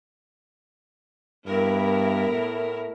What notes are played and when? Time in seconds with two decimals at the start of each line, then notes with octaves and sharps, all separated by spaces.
1.46 G2 B3 E4 A#4
2.29 A2